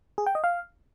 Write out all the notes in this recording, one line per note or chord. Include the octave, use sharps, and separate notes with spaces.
G#4
G5
D#5
F5